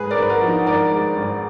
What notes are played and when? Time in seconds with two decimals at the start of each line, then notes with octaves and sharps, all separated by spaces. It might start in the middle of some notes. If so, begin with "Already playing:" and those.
Already playing: G#2 G#4 B4
0.11 A#4 D5
0.17 G#1 B4
0.29 F#4 A#4
0.42 F3
0.48 D#4 F#4
0.67 G#1 A#4 D5
0.91 G#2
1.17 G#1